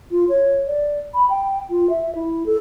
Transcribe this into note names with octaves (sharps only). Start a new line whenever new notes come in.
F4
C#5
D5
B5
G5
F4
E5
E4
A4